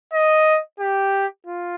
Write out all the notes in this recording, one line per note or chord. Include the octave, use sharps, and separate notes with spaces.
D#5
G4
F4